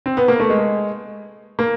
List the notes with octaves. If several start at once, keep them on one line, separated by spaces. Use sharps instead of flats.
C4
B3
A#3
A3
G#3
A#3